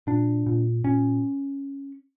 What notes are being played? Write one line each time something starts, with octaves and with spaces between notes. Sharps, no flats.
A#2 D4
A#2
A#2 C#4